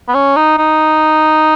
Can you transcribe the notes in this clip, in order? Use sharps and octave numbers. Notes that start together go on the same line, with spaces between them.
B3
C#4
D#4
D#4